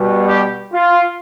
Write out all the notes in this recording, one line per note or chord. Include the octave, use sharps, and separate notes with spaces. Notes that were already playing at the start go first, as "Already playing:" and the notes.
Already playing: B2 G3
G4
F4